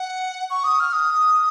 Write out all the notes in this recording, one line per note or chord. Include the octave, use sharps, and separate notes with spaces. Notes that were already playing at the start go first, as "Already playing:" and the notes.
Already playing: F#5
C#6
D#6
F6
D#6